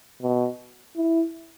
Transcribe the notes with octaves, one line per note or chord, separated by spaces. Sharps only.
B2
E4